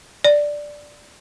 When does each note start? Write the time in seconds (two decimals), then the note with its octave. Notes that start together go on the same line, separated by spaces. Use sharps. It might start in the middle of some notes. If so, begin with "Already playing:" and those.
0.24 D5